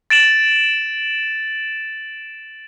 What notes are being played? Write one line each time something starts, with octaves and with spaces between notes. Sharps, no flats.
A6 D7 E7 F#7